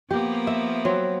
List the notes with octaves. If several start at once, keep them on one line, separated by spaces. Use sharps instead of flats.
F3 A#3 B3 G4
E5
F#3 C4